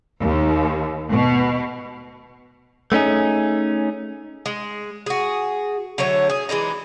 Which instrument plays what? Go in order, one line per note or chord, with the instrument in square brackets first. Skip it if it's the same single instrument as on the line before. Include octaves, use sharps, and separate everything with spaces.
[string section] D#2
B2
[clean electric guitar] A3 B3 C#4 D#4 G#4
[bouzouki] G#3
F#4 G#4
D3 F#3 A3 C#5
G#4
E3 G#3 D4 D#4